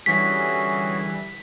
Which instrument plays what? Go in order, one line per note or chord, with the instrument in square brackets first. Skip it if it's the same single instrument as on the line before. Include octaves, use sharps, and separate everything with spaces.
[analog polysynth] D3 E3 G3 [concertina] C#4 F#4 G#4 [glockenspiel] B6